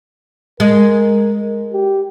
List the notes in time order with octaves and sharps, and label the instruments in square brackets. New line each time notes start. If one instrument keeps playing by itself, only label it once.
[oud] G#3 [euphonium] A#4
[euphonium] G4